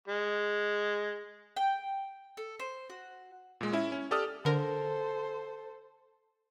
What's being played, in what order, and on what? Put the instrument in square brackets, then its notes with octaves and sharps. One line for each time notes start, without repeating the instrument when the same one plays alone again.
[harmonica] G#3
[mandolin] G5
A4
C5
F#4
[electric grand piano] A#2 G#3
C#4 E4 E5
C#4
G4 A4 D5 D#6 F6
[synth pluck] D3 A#4 [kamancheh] A4 C5